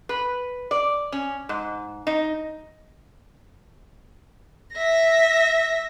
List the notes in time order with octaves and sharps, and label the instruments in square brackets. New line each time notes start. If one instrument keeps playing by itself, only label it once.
[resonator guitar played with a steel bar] B4
D5
C#4
G#2
D#4
[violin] E5 A#6